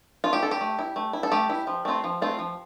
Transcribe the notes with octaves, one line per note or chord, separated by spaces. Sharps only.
A3 F4
G4
E4 A4
G4
A3
E4
A3
E4
A4
A3 G4
E4
F3
A3 C4 F4
F3
A3 C4 F4
F3